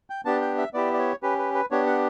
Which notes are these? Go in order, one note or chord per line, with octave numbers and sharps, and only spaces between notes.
G5
B3 D4 G4 A5
G5
E5
B3 E4 G4 D5
D5
C#5
C#4 G4 B4
B4
B4
B3 D4 G4 C#5
F#5